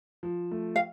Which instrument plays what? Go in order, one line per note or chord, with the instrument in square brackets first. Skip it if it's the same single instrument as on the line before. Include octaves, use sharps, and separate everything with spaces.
[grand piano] F3
A3
[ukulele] F5